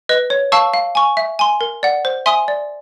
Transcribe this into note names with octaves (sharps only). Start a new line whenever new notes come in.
B4 D#5
C#5
F5 A5 C#6 E6
F5
G#5 C#6
E5
G#5 C6
A#4
D5 F#5
C5
E5 G#5 C6 D#6
D5